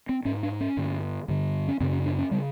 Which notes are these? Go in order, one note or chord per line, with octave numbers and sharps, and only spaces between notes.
C4
G#2 C#4
D4
C#4
G2 D3
G2 D3
C#4
F#2 C#3 C4
C#4
D4
C#4
C#3 G3